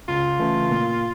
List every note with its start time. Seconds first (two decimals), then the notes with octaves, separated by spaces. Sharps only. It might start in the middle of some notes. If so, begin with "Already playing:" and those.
0.08 C#2 F4
0.39 C#3 E3 A3
0.70 A#2